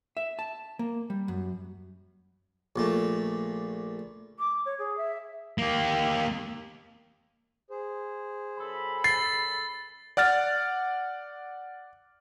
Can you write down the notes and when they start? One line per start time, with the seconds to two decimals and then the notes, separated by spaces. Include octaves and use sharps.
0.17 E5
0.39 A5
0.79 A#3
1.10 G3
1.28 F#2
2.76 A#1 A#2 A3
4.39 D6
4.65 C#5
4.79 G#4
4.98 E5
5.58 A#3 G4
7.70 G#4 C5
8.58 F#2 A4 B5
9.04 A6 C7
10.17 D5 F#5 F6 A6